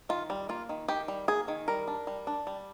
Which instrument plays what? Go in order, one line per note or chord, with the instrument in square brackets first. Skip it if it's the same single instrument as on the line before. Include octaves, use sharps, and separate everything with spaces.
[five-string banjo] D#3 F4
G3
A#3 F4
D#3
D#3 G4
G3
A#3 G#4
D#3
G3 A#4
D4
G3
D4
G3